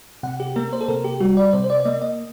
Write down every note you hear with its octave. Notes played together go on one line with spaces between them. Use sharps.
C3 F#5
G4
A#3 A#4
C5
A4
C3 A#4
G4
G3 F#4
D5
C3 C5
C5
D5
D5
A#3 D#5
D#5